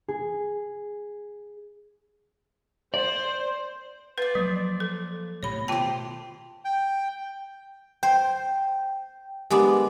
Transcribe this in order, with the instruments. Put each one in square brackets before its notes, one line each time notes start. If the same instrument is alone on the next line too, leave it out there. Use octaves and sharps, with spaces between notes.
[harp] G#4
[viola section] C5 [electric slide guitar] D5
[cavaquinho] F4 D5 [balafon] B4
[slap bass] F3 A#3 [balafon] F#3
[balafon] A4
[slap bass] A2 C3 [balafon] C#5 B5
[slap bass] B2 D#3 A3 [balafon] F4 A5 [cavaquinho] G4 C5
[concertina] G5
[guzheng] C5 [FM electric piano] G5
[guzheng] G#3 B3 D4 [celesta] G4 A#4 B5